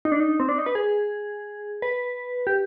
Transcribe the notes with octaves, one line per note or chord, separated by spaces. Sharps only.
D#4
D4
D#4
C4
D4
D#4
B4
G#4
B4
G4